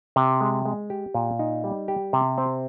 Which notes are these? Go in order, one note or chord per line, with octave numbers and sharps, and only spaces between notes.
C3
G#3
G#3
G4
A#2
D#4
G3
G4
C3
C4